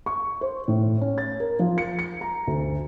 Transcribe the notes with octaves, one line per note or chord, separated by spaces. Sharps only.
C#6
C5
A2
C#4
A6
A#4
F3
C#7
C#7
A#5
D2